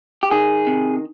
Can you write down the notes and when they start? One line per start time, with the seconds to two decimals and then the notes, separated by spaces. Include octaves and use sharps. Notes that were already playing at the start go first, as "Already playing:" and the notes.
0.23 G4
0.31 D#3 G#4
0.67 C3